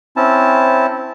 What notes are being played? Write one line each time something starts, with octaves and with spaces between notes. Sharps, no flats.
C4 C#4 E4 A5